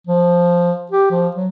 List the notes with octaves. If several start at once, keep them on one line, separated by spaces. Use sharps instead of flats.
F3
G4
F3
F#3